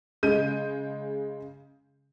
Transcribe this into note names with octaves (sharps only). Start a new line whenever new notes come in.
C#3 G#3 G6 D#7